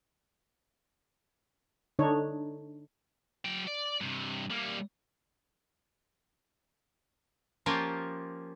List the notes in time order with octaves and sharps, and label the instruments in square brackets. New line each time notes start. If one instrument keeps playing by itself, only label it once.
[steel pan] D3 D4 D#4 C#5
[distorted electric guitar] F#3 G5
D5
G2 C3
G3 A#3
[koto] F3 A#3 C#4 F4 G4